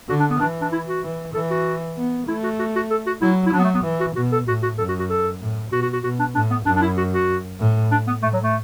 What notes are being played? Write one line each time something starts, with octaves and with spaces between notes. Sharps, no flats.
D3 F#4
D4
B3
E3 D4
D4
E4
F#4
E3
E3 A4
F#4
B3
A3 E4
F#4
F#4
F#4
A4
F#4
F#3 E4
E4
F#3 D4
B3
A3
B3
E3
F#4
B2 F#4
A4
A2 F#4
F#4
F#2 A4
F#4
F#4
A4
A2
B2 F#4
F#4
F#4
B2 F#4
D4
A2 D4
B3
F#2 D4
D4
E4
F#4
F#4
A2
D4
B3
A2 A3
F#3
A3